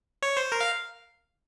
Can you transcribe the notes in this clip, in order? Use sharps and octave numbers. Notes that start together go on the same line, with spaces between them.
C#5
C5
A#4
F5